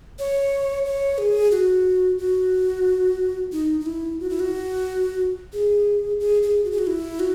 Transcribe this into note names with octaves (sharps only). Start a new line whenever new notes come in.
C#5
C#5
G#4
F#4
F#4
D#4
D#4
E4
F#4
E4
F#4
G#4
G#4
G#4
F#4
G#4
F#4
E4
F#4